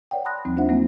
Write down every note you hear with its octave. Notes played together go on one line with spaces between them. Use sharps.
B4 C#5 D5 F#5 G5
A5 B5 C6 D#6 F#6 A#6
D#2 F3 G3 C4 D#4
A3 D4 F4 C5 E5 F#5
F#3 A#3 C4 D#4